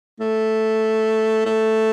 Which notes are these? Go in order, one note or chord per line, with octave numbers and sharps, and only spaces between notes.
A3
A3